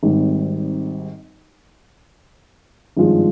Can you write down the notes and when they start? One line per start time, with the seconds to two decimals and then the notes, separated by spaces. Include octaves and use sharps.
0.03 G#1 G#2 G3 C4
2.97 G#1 G2 F3 G#3